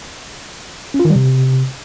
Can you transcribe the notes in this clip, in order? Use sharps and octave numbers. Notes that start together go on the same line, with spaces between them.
C#4
F4
D#3
G3
C3